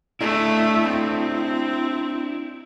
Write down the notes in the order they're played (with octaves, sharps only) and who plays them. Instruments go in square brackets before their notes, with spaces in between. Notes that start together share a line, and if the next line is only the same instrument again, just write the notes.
[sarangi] A3 [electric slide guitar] D4 E4
[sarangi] C4